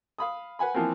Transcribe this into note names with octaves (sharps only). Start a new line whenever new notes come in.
F5 B5 D#6
B4 F#5 G#5 B5
E3 F3 A#3 C4